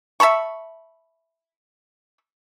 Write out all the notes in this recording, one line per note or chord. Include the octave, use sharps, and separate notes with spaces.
E5 A5 B5 C#6